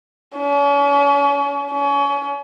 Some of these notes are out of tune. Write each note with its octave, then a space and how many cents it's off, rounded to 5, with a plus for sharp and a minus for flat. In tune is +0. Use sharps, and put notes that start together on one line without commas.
C#4 +40
C#4 +30